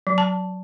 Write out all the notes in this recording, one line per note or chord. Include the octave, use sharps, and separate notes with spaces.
F#3
A5